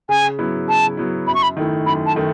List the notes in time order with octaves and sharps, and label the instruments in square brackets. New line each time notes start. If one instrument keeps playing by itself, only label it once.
[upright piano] C#3 [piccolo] G#5
[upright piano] F#3 B3 E4
[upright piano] C#3 [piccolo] A5
[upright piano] F#3 B3 E4
[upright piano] F#2 [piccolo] B5
[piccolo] C#6
B5
[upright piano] D#3 A3 E4
[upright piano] F#2 [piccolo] B5
[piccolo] A5
[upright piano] D#3 A3